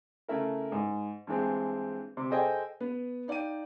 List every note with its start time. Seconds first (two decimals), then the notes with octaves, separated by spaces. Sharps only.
0.28 C#3 A3 E4 A#4
0.72 G#2
1.27 G2 E3 G#3 C4
2.17 C3
2.30 G#4 A4 C5 D#5 G5 G#5
2.80 B3 B4
3.28 D#4 D5 F5 G5 D#7